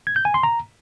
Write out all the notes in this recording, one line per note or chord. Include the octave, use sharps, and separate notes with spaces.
G#6
G6
G#5
C6
A#5